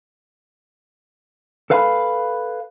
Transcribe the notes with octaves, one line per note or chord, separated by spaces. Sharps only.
A4 B4 F5 G#5 A5 B5